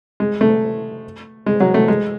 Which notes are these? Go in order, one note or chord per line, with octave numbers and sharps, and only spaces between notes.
G#3
A3
G#3
F#3
A3
G#3